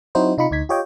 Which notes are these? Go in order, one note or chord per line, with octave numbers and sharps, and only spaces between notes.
F#3 C4 D#4 E4 F#4 C5
C3 D#4 F4 B5 C#7
D2 D#4 G#6 B6
F4 G4 C#5 D#5 G5